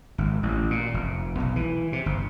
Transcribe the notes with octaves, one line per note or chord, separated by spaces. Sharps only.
G#1
A1
A#2
F1
B1
E3
C3
G1